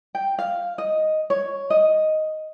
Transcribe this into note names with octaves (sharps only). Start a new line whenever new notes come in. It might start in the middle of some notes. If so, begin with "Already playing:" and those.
G5
F5
D#5
C#5
D#5